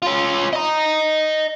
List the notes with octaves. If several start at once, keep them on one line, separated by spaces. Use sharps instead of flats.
C#4 F4
D#5 A#5